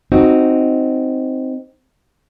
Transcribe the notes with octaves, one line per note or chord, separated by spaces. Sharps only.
C4 D#4 F#4